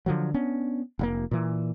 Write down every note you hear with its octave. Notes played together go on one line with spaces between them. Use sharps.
D3 F3 F#3
B3 C#4 D4
F1 G#2 A#3
A#2 E3